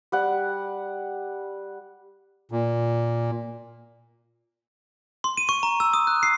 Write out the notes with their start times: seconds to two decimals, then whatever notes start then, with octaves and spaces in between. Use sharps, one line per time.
0.12 G3 F#5
2.51 A#2
5.24 C6
5.37 D#7
5.49 C#6
5.63 A#5
5.80 E6
5.94 D#6
6.07 F#6
6.23 C7